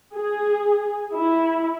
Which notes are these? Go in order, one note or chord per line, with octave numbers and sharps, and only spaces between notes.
G#4
E4